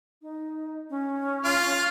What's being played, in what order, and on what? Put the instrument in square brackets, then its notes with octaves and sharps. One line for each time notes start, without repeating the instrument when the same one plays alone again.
[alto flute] D#4
C#4
[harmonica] F4 [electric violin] F6